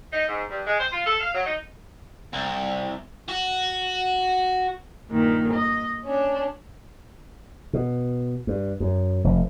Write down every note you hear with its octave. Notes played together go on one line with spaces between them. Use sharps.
D#4
G#2
G2
G#3
C5
F4
A4
F5
F#3
D#4
C2
F#4
G2 A#2 D#3
D#5
C#4 D4
B2
G2
F#2
F1